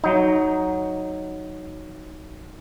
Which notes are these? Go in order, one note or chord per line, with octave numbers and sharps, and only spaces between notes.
F#3 D#4